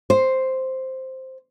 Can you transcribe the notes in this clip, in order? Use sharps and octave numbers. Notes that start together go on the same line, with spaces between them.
C5